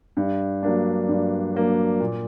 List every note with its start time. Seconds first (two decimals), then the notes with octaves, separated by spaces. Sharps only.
0.17 G2
0.63 F#3 A#3 D4
1.09 G2
1.54 F#3 A#3 D4
2.00 A#2